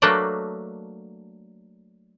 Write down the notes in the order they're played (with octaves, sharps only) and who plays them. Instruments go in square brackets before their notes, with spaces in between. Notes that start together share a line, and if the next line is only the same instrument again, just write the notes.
[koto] F#3 A3 A#3 D4 B4 D#5